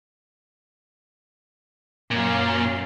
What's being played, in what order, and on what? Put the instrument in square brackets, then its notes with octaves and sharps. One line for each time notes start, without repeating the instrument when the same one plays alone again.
[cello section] F#2 C#5 F5 [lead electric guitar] A#2